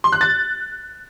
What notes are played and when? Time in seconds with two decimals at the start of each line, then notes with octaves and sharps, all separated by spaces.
0.04 C6
0.12 F#6
0.21 A6